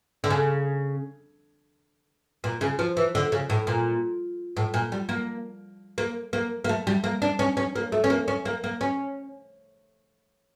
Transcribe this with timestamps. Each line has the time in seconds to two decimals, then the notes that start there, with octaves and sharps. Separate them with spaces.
0.24 D3
0.31 C#3
2.44 A#2
2.61 C#3
2.79 F3
2.97 E3
3.15 D3
3.32 C#3
3.50 A2
3.67 A#2
4.57 A2
4.74 A#2
4.92 G3
5.09 A#3
5.98 A#3
6.33 A#3
6.64 A#3
6.69 A3
6.87 G3
7.04 A#3
7.22 D4
7.39 C#4
7.57 C#4
7.75 A#3
7.92 A3
8.04 C#4
8.10 A#3
8.28 C#4
8.45 A#3
8.64 A#3
8.81 C#4